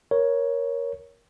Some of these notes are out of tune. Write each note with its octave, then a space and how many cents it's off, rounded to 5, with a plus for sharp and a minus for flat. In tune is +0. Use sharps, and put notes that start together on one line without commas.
A#4 +15 C#5 +0